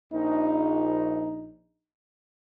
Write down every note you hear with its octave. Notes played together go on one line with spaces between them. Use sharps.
A#1 D#4